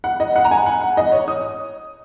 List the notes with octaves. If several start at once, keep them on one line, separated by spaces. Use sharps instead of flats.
F#5
D#5
F#5
A#5
G#5
F#5
F#5
D#5
C#5
D#6